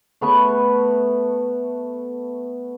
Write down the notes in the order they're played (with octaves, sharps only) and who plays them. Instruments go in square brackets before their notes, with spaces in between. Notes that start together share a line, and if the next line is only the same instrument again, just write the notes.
[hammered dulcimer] A3 B3 B4 C#6